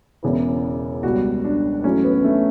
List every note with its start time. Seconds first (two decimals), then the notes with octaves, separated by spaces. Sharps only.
0.23 E1 E2 C#3 E3
1.03 C#2 B2 G3 F#4
1.44 D4
1.84 A1 A2 F#3 C#4
2.04 B3
2.24 A3